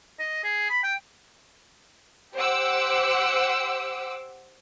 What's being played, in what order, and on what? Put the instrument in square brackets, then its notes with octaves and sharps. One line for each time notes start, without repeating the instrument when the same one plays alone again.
[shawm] D#5
G#4
B5
G5
[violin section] G4 C5 F#5 D6 E6